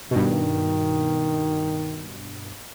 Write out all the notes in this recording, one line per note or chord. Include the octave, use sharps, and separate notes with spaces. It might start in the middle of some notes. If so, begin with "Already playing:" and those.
G2 B2 D#3